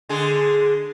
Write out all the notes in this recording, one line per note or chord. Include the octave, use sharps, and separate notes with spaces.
D3 G#3 G#4